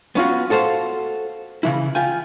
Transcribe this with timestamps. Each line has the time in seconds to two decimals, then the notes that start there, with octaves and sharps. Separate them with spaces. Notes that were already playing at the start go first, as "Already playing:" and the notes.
0.15 B3 C#4 F4 F#4
0.50 F#4 A4 C5 D#5 F5
1.63 C#3 E3 E4
1.95 F4 G5 G#5